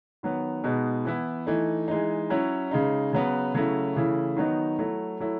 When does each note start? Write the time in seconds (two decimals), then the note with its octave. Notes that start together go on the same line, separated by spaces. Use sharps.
0.23 D#3 F#3 B3
0.64 B2 G#3 B3 D#4
1.05 E3 B3 E4
1.47 E3 A3 D#4
1.88 E3 G#3 D#4
2.30 F#3 C#4 E4
2.71 C#3 G#3 D#4
3.13 C#3 F#3 B3
3.54 C#3 F#3 A3 C#4 E4
3.96 C#3 E3 A3 E4
4.37 D#3 F#3 B3 D#4
4.79 F#3 A3 E4
5.20 F#3 A3 E4